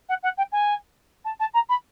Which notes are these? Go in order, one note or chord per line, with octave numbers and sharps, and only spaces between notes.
F#5
F#5
G5
G#5
A5
A5
A#5
B5